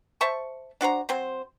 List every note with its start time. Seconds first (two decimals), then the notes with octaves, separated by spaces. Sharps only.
0.21 C5 E5 A5 C#6
0.81 D4 F#4 C5 A#5
1.09 F#3 C4 C5